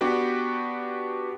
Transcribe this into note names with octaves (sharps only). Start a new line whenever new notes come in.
B3 D4 F#4 G4 B4